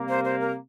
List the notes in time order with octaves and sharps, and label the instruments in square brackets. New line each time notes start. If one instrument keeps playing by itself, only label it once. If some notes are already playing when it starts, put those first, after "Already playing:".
Already playing: [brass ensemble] C3 G3 A#3
[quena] C5
C5
A#4